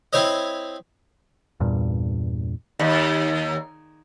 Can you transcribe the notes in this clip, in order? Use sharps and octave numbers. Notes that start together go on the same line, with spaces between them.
C4 E4 C5 C#5 D#5
E2 G2 A#2
D#2